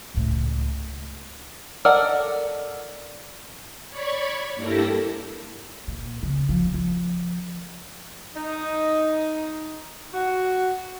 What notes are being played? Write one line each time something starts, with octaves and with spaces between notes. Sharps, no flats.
C#2 A2
A4 A#4 D5 D#5 F#5
C#5 D5 B5 C#6 G#6
G2 A#3 E4 G4 A4 A#6
A#2
C#3
F3
F3
D#4
F#4